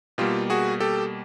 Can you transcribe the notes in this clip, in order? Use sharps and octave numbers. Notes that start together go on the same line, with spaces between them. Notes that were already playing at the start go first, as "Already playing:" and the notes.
B2 G3 A#3 F4 G4
F#4 G#4
G4 A4